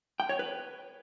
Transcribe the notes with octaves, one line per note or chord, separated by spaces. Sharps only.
G5
C#5
B4